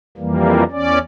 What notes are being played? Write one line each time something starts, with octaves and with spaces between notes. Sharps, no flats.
F2 E3 G3 A#3
E2 C#4 D5